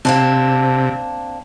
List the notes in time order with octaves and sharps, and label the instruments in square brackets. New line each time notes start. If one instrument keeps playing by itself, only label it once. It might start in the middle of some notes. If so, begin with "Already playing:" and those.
[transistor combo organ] C3 [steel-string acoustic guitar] A#3 C4 D4